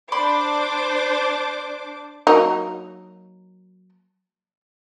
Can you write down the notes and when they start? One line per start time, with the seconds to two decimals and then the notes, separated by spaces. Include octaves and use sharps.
0.12 D4 C5 D5 B5 C6 D6
2.27 F#3 A#3 D#4